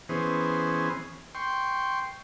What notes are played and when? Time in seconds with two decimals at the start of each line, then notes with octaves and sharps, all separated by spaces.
0.09 E3 B3 C#4 G#4 C5
1.35 G5 C6 C#6